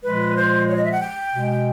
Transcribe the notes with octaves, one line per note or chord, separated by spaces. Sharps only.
A#2 F3 G#3 B4
C5
C#5
D#5
E5
F#5
G5
B2 G#3